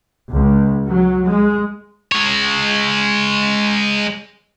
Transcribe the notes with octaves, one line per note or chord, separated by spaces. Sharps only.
C#2
F#3
G#3
G#3 C#5